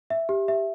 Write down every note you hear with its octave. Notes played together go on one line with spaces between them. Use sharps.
E5
G4
E5